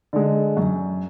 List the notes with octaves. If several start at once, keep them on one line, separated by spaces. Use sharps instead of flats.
D3 G#3
F#2